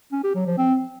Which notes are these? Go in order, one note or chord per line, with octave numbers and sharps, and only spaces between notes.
C#4
G4
F#3
F3
C4